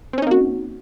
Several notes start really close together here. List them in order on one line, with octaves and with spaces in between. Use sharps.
C4 C#4 D#4 A#3 F#4